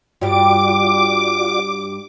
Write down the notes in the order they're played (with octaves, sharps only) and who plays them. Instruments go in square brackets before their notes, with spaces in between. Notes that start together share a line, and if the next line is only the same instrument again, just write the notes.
[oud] G2 G3 [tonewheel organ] F4 F#4 D5 [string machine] D6